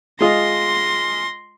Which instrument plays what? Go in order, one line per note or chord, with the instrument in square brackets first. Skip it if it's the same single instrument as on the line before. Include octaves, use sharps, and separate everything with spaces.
[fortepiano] G#3 F4 D#5 [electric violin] C6 A#6